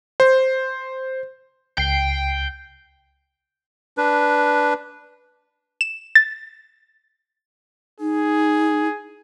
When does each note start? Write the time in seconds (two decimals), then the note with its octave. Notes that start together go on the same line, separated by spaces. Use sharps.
0.20 C5
1.78 C#2 G5 C7
3.98 D4 B4
5.81 E7
6.15 A6
8.00 D#4 G#4